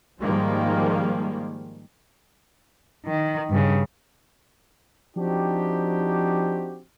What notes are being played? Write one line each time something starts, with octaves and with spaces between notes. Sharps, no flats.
G#2 D#3 F3 G3 G#3 A#3
D#3
G2 C#3
F3 C4 D4 D#4 F#4 G4